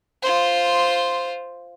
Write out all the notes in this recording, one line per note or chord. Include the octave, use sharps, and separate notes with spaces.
F4 C5